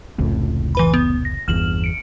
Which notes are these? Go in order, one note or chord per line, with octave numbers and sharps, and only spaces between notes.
F1 C#2 A2
E3 B4 B5
B3
A#6
G1 E2 F6 E7 F#7
C#7 D7